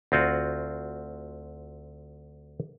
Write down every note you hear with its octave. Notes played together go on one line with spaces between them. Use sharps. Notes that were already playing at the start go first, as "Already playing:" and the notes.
D2 C4 F4 F#4